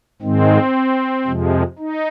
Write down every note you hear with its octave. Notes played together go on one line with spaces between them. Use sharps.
G#2 D#3 G#3 C4
F2 C3 F3 G#3
D#4